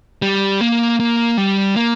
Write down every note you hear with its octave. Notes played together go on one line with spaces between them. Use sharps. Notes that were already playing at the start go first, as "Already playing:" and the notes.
G3
A#3
A#3
G3
A#3